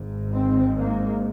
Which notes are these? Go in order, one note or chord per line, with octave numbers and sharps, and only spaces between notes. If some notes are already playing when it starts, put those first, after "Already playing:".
Already playing: G#1 G#2
C4
A#3